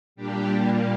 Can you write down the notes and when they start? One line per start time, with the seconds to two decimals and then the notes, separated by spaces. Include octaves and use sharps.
0.16 A#2 G3 D4 G4
0.48 A#2 G3 A#3